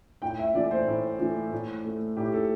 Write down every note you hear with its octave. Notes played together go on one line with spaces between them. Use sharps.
A2 G5
E5
E3 A3 D5
C5
A2
E3 A3
A2
A3
A2 G4
A4